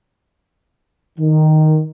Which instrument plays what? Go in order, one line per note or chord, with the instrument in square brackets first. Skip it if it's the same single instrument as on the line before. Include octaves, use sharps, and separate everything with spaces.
[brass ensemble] D#3